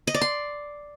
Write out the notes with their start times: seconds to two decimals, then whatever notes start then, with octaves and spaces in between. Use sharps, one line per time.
0.07 D#5
0.14 D5
0.21 C6